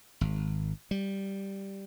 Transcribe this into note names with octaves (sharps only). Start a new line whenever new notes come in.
G#1
G3